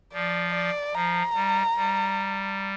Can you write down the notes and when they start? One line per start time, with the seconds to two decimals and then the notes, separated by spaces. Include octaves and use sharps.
0.13 F3 D5
0.54 D5
0.94 F3 A#5
1.35 G3
1.76 G3